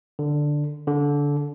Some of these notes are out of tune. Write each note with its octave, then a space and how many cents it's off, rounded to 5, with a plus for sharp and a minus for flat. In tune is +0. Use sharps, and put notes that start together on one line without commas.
D3 +5
D3 -20